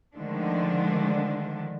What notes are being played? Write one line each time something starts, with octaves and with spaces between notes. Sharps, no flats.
D3 D#3 F3 G#3 A3 D4